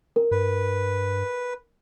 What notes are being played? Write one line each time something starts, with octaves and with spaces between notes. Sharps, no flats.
A#4
G2 B4